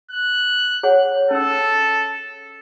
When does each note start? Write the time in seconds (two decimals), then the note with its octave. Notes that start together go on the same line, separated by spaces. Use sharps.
0.11 F#6
0.83 G#4 C#5 F#5
1.31 C#4 A4 E6